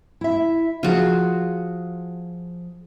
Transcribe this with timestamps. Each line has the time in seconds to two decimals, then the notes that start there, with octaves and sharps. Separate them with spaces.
0.21 E4 E5
0.83 F3 F4 F#4 G#4